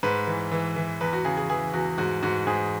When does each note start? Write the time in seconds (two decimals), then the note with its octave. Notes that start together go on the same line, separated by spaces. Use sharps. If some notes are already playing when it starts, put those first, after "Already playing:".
0.03 G#2 B4
0.27 E3
0.52 E3
0.76 E3
1.01 E2 B4
1.13 F#4
1.25 C#3 G#4
1.37 G#4
1.50 E3 G#4
1.73 E2 F#4
1.98 G#2 F#4
2.22 G#2 F#4
2.47 G#2 G#4